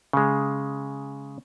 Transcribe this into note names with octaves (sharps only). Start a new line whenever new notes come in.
C#3 G#3